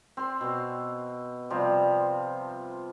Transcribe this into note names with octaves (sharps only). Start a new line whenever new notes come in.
C4 C6
B2
C3 F3 G3 C4